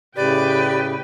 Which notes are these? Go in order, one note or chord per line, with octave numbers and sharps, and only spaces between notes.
A2 C#3 G4 B4 D5 G5